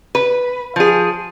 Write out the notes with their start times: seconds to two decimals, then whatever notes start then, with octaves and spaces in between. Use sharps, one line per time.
0.15 B4
0.76 F3 G#4